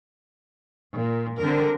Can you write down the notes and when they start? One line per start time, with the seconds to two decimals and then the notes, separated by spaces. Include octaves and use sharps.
0.96 A#2
1.39 D3 G3 C4 A#4